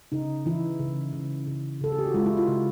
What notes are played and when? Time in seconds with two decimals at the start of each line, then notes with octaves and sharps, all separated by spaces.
0.12 C#3 D#4
0.46 E3 E4
0.80 C#3
1.13 C#3
1.47 C#3
1.81 C#3 A4
1.92 G#4
1.99 G4
2.07 F#4
2.14 G#3 F4
2.26 E4
2.37 F4
2.48 C#3